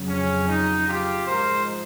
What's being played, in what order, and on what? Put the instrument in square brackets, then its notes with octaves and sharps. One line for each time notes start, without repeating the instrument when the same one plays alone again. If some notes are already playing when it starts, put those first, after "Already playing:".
Already playing: [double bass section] F2 C#3 F#3
[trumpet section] C#4
D#4
F4 G4
[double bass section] G#2 F3 G#3 [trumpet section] A#4 C5